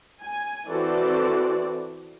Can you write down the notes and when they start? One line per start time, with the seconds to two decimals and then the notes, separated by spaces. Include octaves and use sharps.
0.22 G#5
0.69 E3 C4 F#4 A4 D5